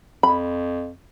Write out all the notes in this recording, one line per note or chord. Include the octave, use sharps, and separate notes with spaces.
F2 B5